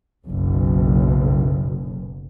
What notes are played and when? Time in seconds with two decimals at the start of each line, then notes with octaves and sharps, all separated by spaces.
0.24 F#1 B1